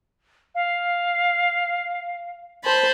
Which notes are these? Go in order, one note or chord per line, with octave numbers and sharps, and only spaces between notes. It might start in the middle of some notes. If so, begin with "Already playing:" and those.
F5
C5 A5 B5